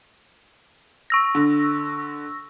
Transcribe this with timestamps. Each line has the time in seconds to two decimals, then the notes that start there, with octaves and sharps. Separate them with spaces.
1.10 C#6 E6 A#6
1.35 D3